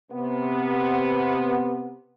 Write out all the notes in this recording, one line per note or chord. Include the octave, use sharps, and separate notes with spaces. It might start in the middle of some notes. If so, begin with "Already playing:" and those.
C3 B3